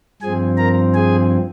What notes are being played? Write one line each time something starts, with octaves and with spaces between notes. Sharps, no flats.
G2 F3 C4 G#4 G#5
A#4 A#5
G#4 G#5